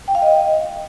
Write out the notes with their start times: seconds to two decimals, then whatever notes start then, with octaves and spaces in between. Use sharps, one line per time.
0.08 G5
0.15 F5
0.22 D#5